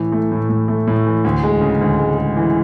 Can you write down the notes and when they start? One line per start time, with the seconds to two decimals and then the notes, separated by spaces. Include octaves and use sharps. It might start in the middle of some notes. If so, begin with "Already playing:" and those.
Already playing: A2 E3
0.12 A3
0.31 A2
0.49 A2
0.68 A3
0.87 A2
1.06 E3
1.25 D2
1.43 G#3
1.61 C#3
1.81 D2
1.99 G#3
2.18 G#3
2.37 E3